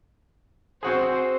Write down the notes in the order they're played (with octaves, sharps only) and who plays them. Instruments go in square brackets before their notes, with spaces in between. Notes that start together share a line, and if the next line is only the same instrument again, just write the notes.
[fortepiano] C4 F#4 G#4 [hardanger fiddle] C5